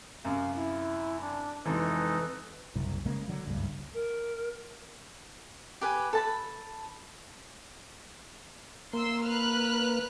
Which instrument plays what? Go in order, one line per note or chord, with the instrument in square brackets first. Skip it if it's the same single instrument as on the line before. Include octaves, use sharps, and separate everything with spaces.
[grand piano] F#2 C3 [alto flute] F5
[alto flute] E4
D4
[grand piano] F2 C3 E3 [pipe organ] G#3 D#4 A4 [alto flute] B4
[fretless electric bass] F#1 C2
C#3 G#3 A#3
D3 F#3
F#1 C#2 G2
[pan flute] A#4
[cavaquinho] G4 B4 G#5
A4 A5 B5
[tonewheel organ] A#3 [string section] C6 E6
[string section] B4 F6 F#6